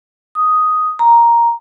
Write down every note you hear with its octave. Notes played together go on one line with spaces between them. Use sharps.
D#6
A#5